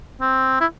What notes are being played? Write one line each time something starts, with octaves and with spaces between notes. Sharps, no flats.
C4
E4